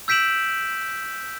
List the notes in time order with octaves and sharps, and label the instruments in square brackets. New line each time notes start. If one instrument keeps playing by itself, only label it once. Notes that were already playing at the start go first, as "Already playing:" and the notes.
[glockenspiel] E6 G6 B6 D7 E7 F#7